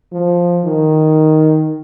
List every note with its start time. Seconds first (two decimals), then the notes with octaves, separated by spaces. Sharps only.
0.12 F3
0.64 D#3